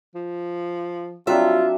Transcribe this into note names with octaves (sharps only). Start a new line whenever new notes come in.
F3
F#3 G3 C4 D4 F4 E5